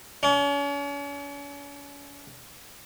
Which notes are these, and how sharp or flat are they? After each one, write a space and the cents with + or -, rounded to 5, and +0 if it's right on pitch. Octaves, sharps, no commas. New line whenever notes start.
C#4 +40